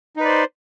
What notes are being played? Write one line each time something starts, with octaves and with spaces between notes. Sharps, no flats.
D#4 B4 C5 D5